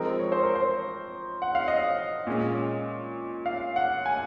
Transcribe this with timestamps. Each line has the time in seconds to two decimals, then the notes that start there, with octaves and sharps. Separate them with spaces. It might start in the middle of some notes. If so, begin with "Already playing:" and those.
Already playing: F3 G#3 C4 D#4 A#4
0.19 C#5
0.32 C5
0.43 A#4
0.55 C5
1.42 F#5
1.55 F5
1.68 D#5
2.27 A#2 G#3 C#4
3.46 F5
3.76 F#5
4.06 G#5